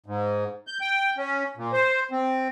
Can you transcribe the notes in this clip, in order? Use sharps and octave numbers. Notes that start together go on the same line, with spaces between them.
G#2
G6
G5
C#4
A#2
C5
C4